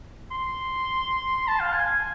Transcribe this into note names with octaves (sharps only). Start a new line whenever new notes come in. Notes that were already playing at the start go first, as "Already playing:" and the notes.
C6
A5
F5
G#5
G#5